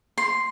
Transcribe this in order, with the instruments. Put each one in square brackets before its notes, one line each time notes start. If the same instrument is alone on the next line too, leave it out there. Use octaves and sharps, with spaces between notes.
[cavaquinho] C6